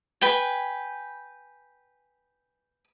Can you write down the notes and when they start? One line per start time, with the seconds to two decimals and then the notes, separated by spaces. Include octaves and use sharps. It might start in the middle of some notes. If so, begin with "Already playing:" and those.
0.21 B4 G5 G#5